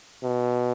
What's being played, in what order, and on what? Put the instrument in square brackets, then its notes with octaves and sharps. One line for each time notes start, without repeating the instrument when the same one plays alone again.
[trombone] B2